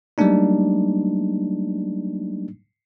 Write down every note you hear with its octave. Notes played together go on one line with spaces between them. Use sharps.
F#3 G3 A3 A#3 D4 D#4